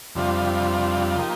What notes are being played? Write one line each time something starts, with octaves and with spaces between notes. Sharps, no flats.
F2 C3 G3 D4 F4
F3 A#3 D#4 G4